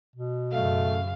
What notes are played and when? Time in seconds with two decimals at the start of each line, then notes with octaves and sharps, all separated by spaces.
0.16 B2
0.52 F#2 C#3 A3 F5